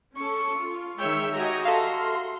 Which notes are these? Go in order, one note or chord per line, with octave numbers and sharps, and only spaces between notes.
C#4 A4 C#6
F4
D#3 G#3 C#5 E5 G5
F#4 G4 D#5 G#5 A#5
A4 E5 F5 C6